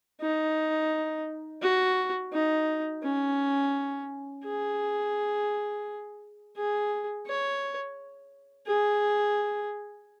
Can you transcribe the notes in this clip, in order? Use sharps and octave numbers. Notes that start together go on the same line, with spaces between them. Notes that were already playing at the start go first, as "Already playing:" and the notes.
D#4
F#4
D#4
C#4
G#4
G#4
C#5
G#4